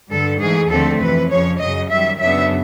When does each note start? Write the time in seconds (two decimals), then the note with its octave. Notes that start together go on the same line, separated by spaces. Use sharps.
0.11 G2 D3 G3 A4
0.40 G#2 E3 A3 G#4
0.70 D#2 D3 F3 A3 C4 A4
1.00 F2 C3 E3 B4
1.29 F2 C#3 F3 C#5
1.59 F#2 C#3 F#3 D#5
1.90 F#2 D#3 G3 E5
2.19 F#2 C#3 F#3 B3 D4 E5